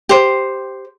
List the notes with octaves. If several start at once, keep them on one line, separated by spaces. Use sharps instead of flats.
G4 C5